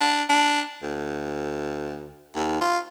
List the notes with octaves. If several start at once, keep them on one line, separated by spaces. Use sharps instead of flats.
D4
D4
D2
D#2
F4